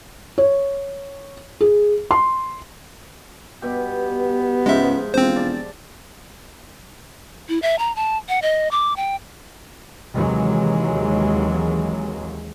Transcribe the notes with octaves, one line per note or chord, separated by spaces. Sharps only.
C#5
G#4
C6
G2 B2 B3 G4
C#2 G#2 F3 G#3 E5
E1 C4 F4 C5
D5 A5
E4
E5
A#5
A5
F#5
D#5
D6
G5
D#2 C3 E3 F#3 G#3